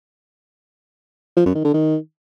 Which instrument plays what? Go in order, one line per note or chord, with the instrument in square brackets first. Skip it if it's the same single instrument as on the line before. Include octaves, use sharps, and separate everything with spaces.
[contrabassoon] F3
F#2
D#3
D3
D#3